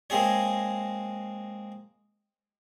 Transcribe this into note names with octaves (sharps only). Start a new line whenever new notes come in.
G#3 A#3 C4 G#4 C#5